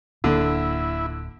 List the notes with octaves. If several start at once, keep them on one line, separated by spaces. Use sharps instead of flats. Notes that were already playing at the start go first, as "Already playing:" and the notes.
D1 D3 A#3 E4